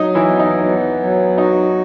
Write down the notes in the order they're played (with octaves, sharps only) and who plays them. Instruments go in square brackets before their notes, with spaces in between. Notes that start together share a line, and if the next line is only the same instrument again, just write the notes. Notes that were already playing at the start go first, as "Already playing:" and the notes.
Already playing: [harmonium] F#3 [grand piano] D#4 D#5
[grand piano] E3 E4
[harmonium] B3
[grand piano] D#4
[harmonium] B3
F#3
[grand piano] D#4 [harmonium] F#4